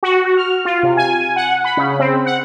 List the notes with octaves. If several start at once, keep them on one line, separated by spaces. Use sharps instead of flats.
F#4
F#4
F6
F4
C3
G#5
F#5
B5
C#3
C4
F#5